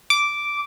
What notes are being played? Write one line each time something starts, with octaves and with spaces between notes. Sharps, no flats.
D6